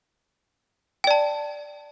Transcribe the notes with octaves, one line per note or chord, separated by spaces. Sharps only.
D5 G5 A5